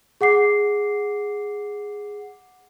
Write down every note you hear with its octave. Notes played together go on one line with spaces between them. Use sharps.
G#4 F#5 D6 C7